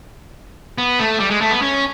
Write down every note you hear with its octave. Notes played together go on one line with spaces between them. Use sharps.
B3
A3
G3
G#3
A3
B3
C#4